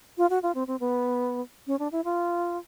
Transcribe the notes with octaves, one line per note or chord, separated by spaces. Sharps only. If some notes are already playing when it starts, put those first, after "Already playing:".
F4
F#4
F4
C4
C4
B3
C#4
D4
E4
F4